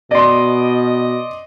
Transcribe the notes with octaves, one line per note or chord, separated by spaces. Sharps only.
B2 D5 D#5 C6